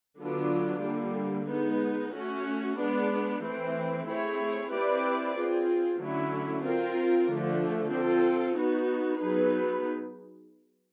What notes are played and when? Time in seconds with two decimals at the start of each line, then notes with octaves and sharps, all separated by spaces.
0.20 D3 F#3 B3 D4 F4
0.84 D3 G3 A#3
1.48 G#3 B3 D#4
2.13 A3 C#4 F#4
2.77 G#3 B3 D4
3.42 E3 A3 C4
4.06 A3 C4 E4 G#4 C#5
4.71 C4 E4 G4 B4 D5
5.34 C4 F4 G#4
5.99 D3 F#3 A3 C#4 E4
6.63 C4 F4 A#4
7.28 D3 F3 A3
7.92 C4 F4 A4
8.57 B3 D#4 F#4
9.21 F#3 B3 D#4 G#4 B4